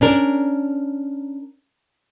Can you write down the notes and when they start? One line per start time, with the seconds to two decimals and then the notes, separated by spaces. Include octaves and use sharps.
0.01 C#4 D4 A#4